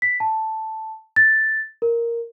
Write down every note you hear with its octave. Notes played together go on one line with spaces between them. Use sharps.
B6
A5
A6
A#4